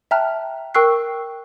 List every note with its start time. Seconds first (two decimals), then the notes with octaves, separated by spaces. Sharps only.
0.11 E5 G5 A5 A#5 F6 F#6
0.74 A#4 G5 C#6 E6 F#6 C7